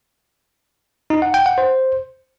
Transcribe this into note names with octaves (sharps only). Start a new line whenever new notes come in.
D#4
F#5
G5
F#5
C5